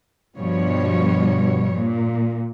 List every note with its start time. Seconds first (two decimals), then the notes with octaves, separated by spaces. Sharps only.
0.37 G2 B2 F3 G3 C#5
1.76 A#2